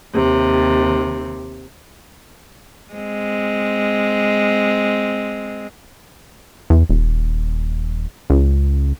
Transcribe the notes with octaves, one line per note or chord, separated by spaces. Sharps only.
D#2 C3
G#3 C4
E2
D#1
C#2